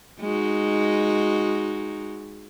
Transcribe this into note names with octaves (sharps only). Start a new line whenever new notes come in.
G#3 D#4 F#4